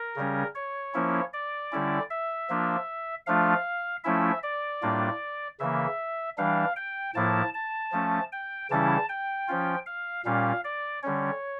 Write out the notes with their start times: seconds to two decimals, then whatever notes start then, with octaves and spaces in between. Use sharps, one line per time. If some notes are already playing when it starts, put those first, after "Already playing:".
Already playing: A#4
0.16 C#3 G3 C#4
0.55 C#5
0.94 F3 A#3 C#4 E4
1.33 D5
1.72 D3 G3 C#4 E4
2.10 E5
2.50 F3 A#3 D4 F4
3.26 F3 A3 D4 F4 F5
4.04 F3 A3 C#4 E4 E5
4.43 D5
4.82 A2 G3 A#3 D4 F4
5.60 C#3 E3 A#3 E5
6.38 E3 G3 D4 F5
6.76 G5
7.15 A2 F3 A#3 E4 A5
7.54 A5
7.92 F3 A3 C#4
8.32 G5
8.70 C#3 E3 G3 C#4 E4 A5
9.09 G5
9.48 F3 C#4 F4
9.86 F5
10.25 A#2 G3 C#4 F5
10.64 D5
11.03 D3 G3 C#4 C#5